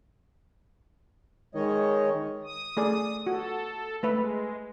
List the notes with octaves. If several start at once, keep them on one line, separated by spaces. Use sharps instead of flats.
D#3 G#3 C#5 D#5
D#6
A3 G#4 D5
F#4 A4
G#3 A3 B4 E5